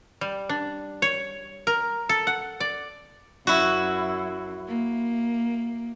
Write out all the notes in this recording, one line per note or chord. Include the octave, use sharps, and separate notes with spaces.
G3
D4
C#5
A#4
A4
F#5
D5
F#2 E4 F#4
A#3